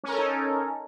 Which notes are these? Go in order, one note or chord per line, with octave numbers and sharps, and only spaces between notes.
C#4 D#4 A4 A#4